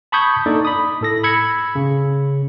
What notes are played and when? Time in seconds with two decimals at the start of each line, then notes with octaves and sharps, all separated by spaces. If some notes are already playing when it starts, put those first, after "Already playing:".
0.12 A5 B5 C#6 D#6 G6 G#6
0.46 A#3 D4 D#4 A4 D5
0.65 B5 D#6
1.01 A2 A4 A#6
1.24 B5 E6 G#6 C#7
1.75 C#3